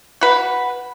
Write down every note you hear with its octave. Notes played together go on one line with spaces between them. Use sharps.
F#4 B4